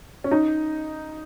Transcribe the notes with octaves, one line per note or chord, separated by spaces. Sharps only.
C#4
D#4